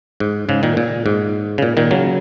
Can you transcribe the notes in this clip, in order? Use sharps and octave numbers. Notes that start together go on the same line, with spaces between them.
G#2
G#2 C#3
A#2 D#3
A#2
G#2
C#3
A#2
A#2 D#3
C#3 F#3